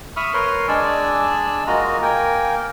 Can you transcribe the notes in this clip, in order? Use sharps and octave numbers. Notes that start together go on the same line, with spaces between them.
E5 B5 C#6 D#6 F6
A#4 B4 C#5 C6 F6
G#3 D4 D5 G#5 E6
G#3 A#3 F4 F#4 D#5 A#5
A#3 A#4 G5 G#5